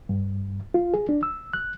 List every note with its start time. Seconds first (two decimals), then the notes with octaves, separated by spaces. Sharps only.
0.09 G2
0.74 F4
0.94 G#4
1.09 D4
1.23 E6
1.53 F#6